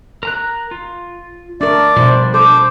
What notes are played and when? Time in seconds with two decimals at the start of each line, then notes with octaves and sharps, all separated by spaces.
0.23 A#4 A#5 F#6
0.71 F4
1.61 A3 D4 A#4 D5
1.97 B2 F3 G3 D4 C5
2.34 A4 C5 D6